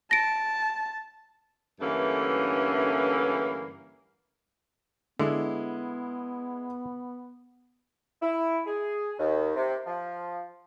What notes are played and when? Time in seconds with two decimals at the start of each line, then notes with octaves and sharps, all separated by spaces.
0.11 A5 A#6 D7
1.81 G2 D3 E3 A3 A#3 C#4
5.19 D3 G#3 B3 E4
8.21 E4
8.66 G#4
9.19 D#2
9.55 C3
9.86 F3